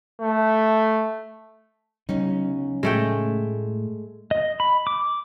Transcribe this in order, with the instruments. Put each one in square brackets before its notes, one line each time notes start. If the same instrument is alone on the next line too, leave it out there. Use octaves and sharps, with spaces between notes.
[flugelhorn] A3
[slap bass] D2 F#3 B3 [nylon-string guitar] C#3 C#4 D#4
[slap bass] A2 [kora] G#3 A3 G5
[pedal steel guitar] D#5
B5
D6